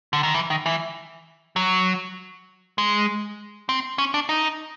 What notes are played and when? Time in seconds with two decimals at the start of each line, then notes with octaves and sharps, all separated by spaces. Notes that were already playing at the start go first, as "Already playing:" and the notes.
0.13 D3
0.23 D#3
0.34 E3
0.50 D#3
0.66 E3
1.56 F#3
2.78 G#3
3.69 C4
3.98 C#4
4.14 D4
4.29 D#4